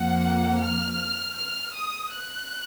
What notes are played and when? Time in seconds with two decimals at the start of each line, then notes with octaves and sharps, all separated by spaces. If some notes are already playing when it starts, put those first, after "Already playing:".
Already playing: F2 F3 A#3 F#5
0.61 F6
1.36 F6
1.73 D#6
2.11 F#6